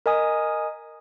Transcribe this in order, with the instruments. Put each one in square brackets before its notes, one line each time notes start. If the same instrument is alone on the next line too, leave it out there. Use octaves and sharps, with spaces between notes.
[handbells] A#4 D#5 G#5 D#6